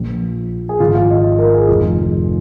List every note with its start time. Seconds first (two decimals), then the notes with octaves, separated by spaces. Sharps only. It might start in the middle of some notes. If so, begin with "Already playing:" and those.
Already playing: A#1 A#2 F3
0.69 G#4
0.80 G#1 G#2 F3 F4
0.95 F5
1.10 D#5
1.39 A#4
1.55 G#4
1.68 F1 F2 D#3 F4